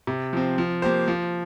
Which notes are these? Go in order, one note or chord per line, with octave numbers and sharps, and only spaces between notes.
C3
F3 C4
F3
A#3 G4 C5
F3